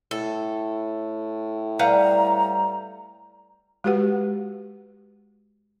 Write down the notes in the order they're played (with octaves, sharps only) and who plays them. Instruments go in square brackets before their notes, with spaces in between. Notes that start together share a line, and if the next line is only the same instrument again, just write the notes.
[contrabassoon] A2 [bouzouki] A4
[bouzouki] G3 [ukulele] B4 F5 F#5 [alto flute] A#5
[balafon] G#3 F#4 G4 B4 F#5